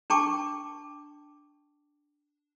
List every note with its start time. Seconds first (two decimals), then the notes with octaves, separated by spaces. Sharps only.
0.10 D4 G5 A5 C#6 D6